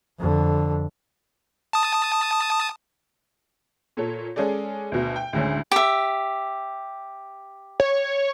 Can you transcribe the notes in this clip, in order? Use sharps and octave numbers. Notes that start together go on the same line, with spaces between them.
F2 D3
A5 D#6
A#2 A4 C#5
G#3 C#4 G#4 A4 D5
D2 B2
G5
D2 A2 D3 G#3 C#4
G4 E5
C#5